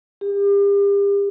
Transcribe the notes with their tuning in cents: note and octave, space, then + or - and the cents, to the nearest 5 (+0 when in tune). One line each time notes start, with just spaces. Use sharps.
G4 +40